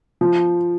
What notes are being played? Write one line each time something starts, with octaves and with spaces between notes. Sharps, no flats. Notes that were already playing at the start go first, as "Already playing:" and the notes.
F3